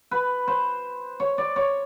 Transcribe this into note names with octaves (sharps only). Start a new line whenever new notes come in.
B4
C5
C#5
D5
C#5